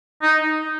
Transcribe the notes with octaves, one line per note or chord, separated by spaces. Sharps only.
D#4